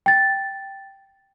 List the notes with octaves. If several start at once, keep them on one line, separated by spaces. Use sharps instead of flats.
G5 A6